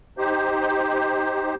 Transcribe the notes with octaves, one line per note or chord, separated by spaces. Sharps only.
D#4 G4 C5